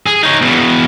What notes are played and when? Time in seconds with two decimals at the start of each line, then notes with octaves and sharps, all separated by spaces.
0.06 G#4
0.23 D#4 C#5
0.42 E2 B2